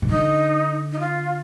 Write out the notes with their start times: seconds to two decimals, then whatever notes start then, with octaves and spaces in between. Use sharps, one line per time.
0.02 C3
0.09 D3 D#4
0.92 D#4
0.99 F4